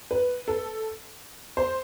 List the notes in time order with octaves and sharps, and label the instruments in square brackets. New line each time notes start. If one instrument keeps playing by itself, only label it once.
[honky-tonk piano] B4
A4
C5